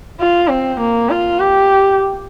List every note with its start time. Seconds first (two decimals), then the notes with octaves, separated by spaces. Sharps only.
0.21 F4
0.50 C4
0.80 A#3
1.10 F4
1.40 G4